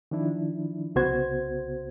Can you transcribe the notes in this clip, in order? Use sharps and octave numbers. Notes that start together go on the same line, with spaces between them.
D#3 F3 D4 E4
C2 C#3 B3 F#4 C5 G#6